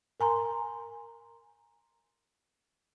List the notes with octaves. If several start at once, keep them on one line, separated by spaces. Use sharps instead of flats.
A#4 G#5 A#5 C6